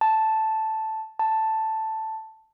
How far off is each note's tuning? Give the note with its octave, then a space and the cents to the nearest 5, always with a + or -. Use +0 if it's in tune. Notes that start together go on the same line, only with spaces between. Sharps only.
A5 +0
A5 +5